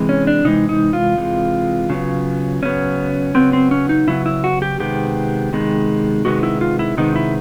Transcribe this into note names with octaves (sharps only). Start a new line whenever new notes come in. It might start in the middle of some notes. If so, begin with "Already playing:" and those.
Already playing: C3 E3 G#3
C#4
D4
C3 E3 G#3 D#4
D#4
F4
C3 E3 G#3
C#3 F#3 B3
C#3 F#3 B3 C#4
C#3 F#3 B3 C4
C4
C#4
D#4
C#3 F#3 B3 E4
E4
F#4
G4
C3 D#3 G#3 B3 G4
C3 D#3 G#3 B3
C3 D#3 G#3 B3 F#4
E4
F4
E4
C3 D#3 G#3 B3 D#4
E4